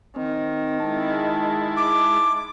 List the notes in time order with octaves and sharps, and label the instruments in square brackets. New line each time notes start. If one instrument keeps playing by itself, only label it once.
[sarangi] D#3 [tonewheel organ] C4
[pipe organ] G#3 E4 [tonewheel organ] A5
[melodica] D6